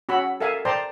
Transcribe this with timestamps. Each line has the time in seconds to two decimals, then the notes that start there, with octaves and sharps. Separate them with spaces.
0.09 C#4 F#4 F#5 B5 E6
0.40 A4 A#4 E5 F5 G#5 A5
0.65 C5 D5 G5 A5 A#5 C6